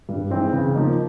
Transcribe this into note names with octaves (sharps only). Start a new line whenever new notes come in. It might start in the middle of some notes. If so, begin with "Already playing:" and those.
G2
E3 G#3 C4 D#4
C#3
F3 A#3 D#4